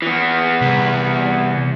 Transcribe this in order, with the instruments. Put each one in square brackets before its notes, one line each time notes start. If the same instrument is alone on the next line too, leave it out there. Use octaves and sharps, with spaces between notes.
[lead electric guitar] E3 B3
[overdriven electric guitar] C2